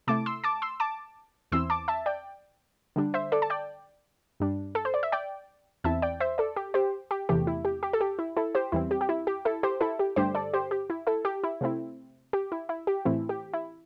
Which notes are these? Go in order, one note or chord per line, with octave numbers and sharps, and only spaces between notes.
C3 A3 E4 A5 D6
C6 E6
A5 D6
C6 E6
A5 D6
E2 E3 C4 E4 C6 E6
A5 D6
E5 A5
D5 G5
D3 G3 D4
C5 E5
A4 D5
A5
D5 G5
G2 G3 D4
A4
C5
D5
E5
D5 G5
E2 E3 C4 E4 E5 A5
D5 G5
C5 E5
A4 D5
G4
G4 C5
G4
E2 C3 E3 A3 G4
E4
G4
G4
A4
G4
E4
E4 A4
G4 C5
E2 E3 G3 C4 E4
G4
G4
E4
G4
E4 A4
G4 C5
E4 A4
G4
G2 D3 A3 D4 G4 C5
A4 D5
G4 C5
G4
E4
E4 A4
G4
E4
C3 A3 C4 E4
G4
E4
E4
G4
A2 E3 A3 C4 E4
G4
E4